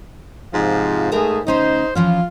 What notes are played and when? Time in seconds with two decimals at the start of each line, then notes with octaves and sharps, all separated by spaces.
0.54 G#2 C3 F3
1.12 G#2 A3 G#4 A#4 C5 E5
1.47 D2 C#4 D#4 C5 D#5
1.95 E3 F3 C#4 F4